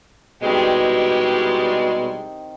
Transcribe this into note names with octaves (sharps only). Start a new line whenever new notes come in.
B2 D#3 G3 G#3 C4 E4 G4